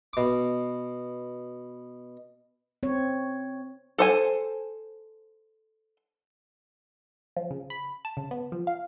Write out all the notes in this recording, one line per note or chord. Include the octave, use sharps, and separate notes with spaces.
B2 D6
C4 C#5
A4 C5 G#5
F3
C#3
B5
A5
C#3
B3
F3
F5